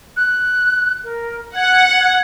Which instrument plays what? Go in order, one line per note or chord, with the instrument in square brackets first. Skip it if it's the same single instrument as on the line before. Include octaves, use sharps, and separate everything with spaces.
[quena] F#6
A#4
[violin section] F#5 [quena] G#6